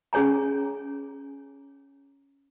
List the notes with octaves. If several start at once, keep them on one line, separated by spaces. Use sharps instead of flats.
C#4 G#4 C#5 G#5 A#5